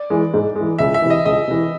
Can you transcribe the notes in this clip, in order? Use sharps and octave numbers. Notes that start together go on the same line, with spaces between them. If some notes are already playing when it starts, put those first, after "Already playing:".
Already playing: D5
E3 G#3
G#2
G#3
E3
C#2 E5
E5
C3 E3
D#5
C#2 D#5
C3 E3